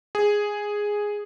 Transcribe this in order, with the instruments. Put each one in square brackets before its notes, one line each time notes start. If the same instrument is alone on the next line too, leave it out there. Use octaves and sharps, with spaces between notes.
[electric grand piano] G#4